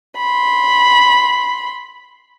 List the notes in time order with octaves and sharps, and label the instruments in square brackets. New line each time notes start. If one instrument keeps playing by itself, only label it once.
[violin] B5 C6